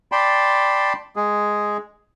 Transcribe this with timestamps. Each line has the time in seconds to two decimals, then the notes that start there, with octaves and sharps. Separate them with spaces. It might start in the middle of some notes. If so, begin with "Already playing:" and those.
0.12 D5 G5 A5 B5 C6
1.16 G#3 G#4